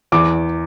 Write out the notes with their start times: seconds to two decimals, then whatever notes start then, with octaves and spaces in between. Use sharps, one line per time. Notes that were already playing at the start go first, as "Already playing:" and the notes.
0.12 E2 D6